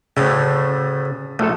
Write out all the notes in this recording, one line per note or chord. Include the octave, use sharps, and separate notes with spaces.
D2 A2 C#3
A#1 A3 F4 A4